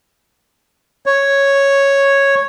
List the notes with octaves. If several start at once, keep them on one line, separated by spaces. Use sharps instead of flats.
C#5